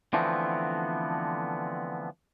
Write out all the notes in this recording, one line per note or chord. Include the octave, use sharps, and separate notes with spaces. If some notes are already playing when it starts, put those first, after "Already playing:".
D3 E3 F3 A3 B3 C4